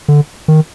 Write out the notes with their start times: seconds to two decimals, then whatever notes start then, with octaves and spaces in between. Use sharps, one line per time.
0.08 D3
0.48 D#3